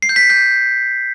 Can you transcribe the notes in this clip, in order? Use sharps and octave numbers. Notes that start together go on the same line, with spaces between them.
C7
G6
B6
C7
G6